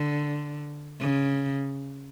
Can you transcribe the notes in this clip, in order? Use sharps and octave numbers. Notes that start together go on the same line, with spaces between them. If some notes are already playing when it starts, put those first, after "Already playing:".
Already playing: D3
C#3